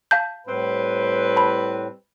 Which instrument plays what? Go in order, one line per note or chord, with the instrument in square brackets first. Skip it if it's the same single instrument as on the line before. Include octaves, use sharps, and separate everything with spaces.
[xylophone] F5 A5 G6
[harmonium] A2 [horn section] G3 C4 B4
[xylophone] A5 B5